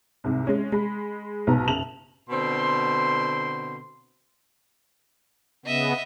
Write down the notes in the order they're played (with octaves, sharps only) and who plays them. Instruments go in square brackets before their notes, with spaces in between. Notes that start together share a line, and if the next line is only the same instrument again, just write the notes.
[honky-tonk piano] C2 G#2 C3
G#3 C#4
G#3 B5
B1 G#2 B2 B3 A#5
F#1 C#3 A5 F7 F#7
[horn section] B2 D3 C4 C6
[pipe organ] C#3 B3 [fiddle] D#5 E5